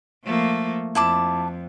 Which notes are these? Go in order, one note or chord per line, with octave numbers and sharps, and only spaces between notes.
F3 A3 A#3
F2 E4 A5 D6